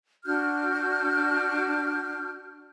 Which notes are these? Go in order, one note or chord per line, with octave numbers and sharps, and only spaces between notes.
D4 F#4 F6 G6